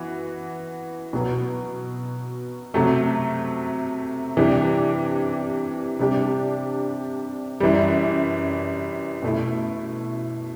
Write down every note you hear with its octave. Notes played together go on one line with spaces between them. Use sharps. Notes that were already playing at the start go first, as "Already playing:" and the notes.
Already playing: E3 B3 F#4
B2 F#3 B3
C3 F#3 A3
C3 E3 G3 D4 G4
C3 G3 D4 G4
F#2 E3 G3
B2 A3 E4